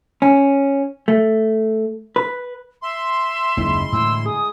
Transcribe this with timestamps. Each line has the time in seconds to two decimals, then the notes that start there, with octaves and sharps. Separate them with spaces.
0.22 C#4
1.08 A3
2.16 B4
2.82 E5 C6
3.57 F#1 D#2 D#3 G#3 E4
3.92 A2 D3 E3 E6
4.26 G#4 D#6